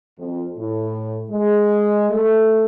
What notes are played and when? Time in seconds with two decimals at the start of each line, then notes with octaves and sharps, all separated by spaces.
0.19 F2
0.57 A2
1.30 G#3
2.11 A3